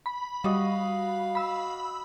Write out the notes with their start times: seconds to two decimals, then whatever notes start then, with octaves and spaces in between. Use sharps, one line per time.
0.06 B5
0.44 G3 F#4 D#5 F5
1.35 B5 E6